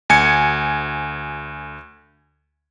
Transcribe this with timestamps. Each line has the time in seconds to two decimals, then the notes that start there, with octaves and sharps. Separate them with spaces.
0.10 D2 G#5 G#6 C#7